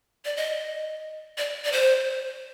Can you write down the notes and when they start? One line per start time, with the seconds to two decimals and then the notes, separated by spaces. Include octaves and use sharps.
0.25 D5
0.36 D#5
1.38 D5
1.64 D5
1.72 C5